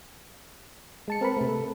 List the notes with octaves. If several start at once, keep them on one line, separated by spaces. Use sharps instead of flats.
G#3 A5 C#7
C4 A#4 B4 B5
C3 A3
A4